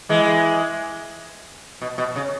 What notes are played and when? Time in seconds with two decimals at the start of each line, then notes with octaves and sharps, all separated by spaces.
0.09 E3 G#3
1.82 B2
1.98 B2
2.16 C#3